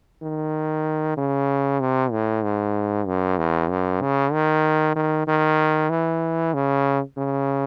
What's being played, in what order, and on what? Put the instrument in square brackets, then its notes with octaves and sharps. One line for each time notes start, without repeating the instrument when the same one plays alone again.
[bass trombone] D#3
C#3
C3
A2
G#2
F#2
E2
F#2
C#3
D#3
D#3
D#3
E3
C#3
C#3